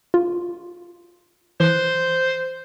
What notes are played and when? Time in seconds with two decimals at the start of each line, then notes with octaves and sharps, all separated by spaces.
0.14 F4
1.60 E3 C5 F#6